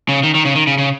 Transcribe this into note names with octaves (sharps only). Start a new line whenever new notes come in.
C#3
D#3
D#3
C#3
D#3
C#3
C#3